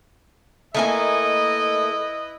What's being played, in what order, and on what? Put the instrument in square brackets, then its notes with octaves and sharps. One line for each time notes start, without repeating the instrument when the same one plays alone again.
[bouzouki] A3 A#3 G#5 [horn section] E4 B4 D#5